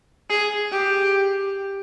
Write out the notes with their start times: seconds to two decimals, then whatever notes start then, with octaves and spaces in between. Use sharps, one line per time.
0.30 G#4
0.72 G4